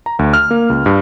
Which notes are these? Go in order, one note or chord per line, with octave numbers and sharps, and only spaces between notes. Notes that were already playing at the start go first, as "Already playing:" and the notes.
A#5
D2
F6
A#3
C#2
G2